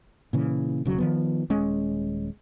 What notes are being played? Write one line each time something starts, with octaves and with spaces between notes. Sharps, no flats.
A#2 C#3 E3
E1 C#3 F#3
D#3 F3 B3
D#1 G#3 C#4